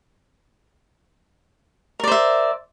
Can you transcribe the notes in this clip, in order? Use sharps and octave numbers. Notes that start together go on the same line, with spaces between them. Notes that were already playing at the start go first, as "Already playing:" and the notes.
A#4 C5 D5 E5